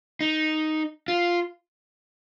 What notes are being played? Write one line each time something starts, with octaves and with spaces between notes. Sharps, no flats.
D#4
F4